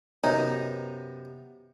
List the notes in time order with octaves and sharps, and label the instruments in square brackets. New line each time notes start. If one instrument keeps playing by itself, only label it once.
[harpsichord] F#2 C3 [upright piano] B3 [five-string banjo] D#4 [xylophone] C#5